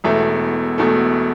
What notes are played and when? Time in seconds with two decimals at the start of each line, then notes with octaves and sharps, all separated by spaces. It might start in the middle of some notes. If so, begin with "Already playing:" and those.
0.04 E1 E2 B2 A3 E5
0.78 E1 E2 B2 A3